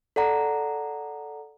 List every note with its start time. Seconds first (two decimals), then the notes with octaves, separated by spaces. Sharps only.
0.16 A4 D5 F#5 A#5